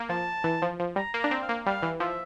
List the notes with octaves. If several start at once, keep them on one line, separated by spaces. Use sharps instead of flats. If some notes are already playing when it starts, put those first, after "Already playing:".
Already playing: A#3
F3 A5
E3
F3
F3
G3 A#5
A#3
D4 A#5
C4
F5
A#3
G3 F5
E3
F3 E5